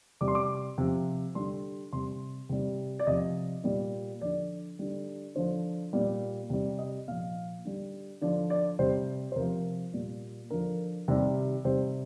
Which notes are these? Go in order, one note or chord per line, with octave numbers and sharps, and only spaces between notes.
C3 G3 D6
C6
D6
C3 F3
D3 G3 C6
C3 G3 C6
C3 G3
D5
C3 F3 D#5
A#2 G3
D3 F3 D5
D3 G3
D3 F3 C5
A#2 G3
C3 G3
D#5
A#2 F3 F5
D3 G3
D3 F3 D5
D5
C3 G3 C5
C5
C3 F3 A#4
A#2 G3
D3 F3 A#4
C3 D#3 G3
C3 G3 C5